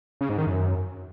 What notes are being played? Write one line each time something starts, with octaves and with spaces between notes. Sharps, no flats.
C#3
G#2
D#3
F#2